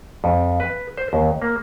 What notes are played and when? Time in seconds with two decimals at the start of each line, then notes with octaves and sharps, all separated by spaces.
0.24 F2
0.60 B4
0.97 C5
1.13 D#2
1.42 A#3